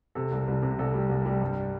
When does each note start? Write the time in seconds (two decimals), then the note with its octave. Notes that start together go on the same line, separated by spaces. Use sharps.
0.15 C3 A4
0.31 C2
0.48 C2
0.62 C3
0.79 C2 A4
0.94 G3
1.09 C2
1.26 G3
1.41 G2